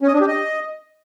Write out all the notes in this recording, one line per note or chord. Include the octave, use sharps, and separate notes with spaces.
C#4
D#5
D4
G4
D#5